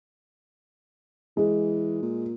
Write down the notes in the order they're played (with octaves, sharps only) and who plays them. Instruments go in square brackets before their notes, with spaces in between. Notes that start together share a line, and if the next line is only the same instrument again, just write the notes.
[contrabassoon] E3 [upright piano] G#3
[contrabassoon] A#2